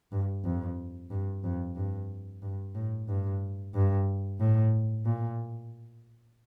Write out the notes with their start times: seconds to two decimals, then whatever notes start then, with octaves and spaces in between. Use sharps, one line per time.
0.12 G2
0.45 F2
1.11 G2
1.44 F2
1.76 G2
2.42 G2
2.75 A2
3.08 G2
3.74 G2
4.40 A2
5.06 A#2